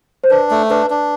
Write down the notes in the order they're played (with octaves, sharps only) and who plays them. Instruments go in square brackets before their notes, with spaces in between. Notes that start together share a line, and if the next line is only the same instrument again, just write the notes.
[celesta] C5
[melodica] D4 [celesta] B4
[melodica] A3
[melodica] D4 [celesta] B4
[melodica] D4